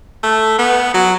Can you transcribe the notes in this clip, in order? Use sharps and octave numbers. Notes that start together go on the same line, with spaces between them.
A3
B3
F#3